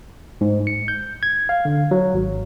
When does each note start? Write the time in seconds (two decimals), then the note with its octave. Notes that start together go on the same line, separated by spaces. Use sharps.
0.41 G#2
0.67 C#7
0.88 G6
1.23 G#6
1.49 F5
1.65 D3
1.91 F#3
2.14 G#1